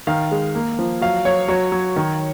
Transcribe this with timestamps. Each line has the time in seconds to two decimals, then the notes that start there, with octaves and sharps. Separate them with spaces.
0.07 D#3 F5
0.31 G#3
0.55 A#3
0.79 F3
1.01 F#3 F5
1.25 F#3 C#5
1.48 F#3 C#5
1.72 F#3
1.96 D#3